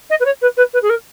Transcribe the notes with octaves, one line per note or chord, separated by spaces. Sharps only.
D#5
B4
C#5
B4
B4
B4
G#4
A#4